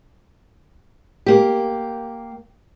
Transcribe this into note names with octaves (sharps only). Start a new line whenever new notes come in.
A#3 G4